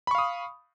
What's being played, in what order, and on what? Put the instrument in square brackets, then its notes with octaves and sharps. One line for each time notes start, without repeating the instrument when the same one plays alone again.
[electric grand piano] B5
C#6
F5
D#6